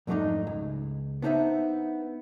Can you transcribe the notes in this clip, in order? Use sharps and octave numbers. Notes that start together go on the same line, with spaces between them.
F2 G#2 F#3 A3 D4 D#4
C#2
B3 D4 D#4 C5 E5